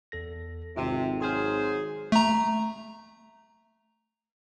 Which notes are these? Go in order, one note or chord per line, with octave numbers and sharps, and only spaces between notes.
E2 A4 A#6
G#1 C3 C4 F4
F#3 G#4 C5 C6 F6
A3 A#5